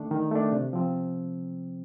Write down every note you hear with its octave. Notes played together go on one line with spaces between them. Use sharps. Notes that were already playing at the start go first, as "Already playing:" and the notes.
Already playing: D#3 A3 D4
D#3
A3 D4
C3
F3 C4